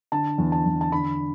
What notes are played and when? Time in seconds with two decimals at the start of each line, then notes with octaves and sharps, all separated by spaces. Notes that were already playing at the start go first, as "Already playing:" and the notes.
0.12 D3 A5
0.38 E2
0.52 A5
0.66 E2
0.81 A5
0.92 D3 B5